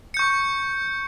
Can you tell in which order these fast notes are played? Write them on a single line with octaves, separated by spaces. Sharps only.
C#7 G6 C#6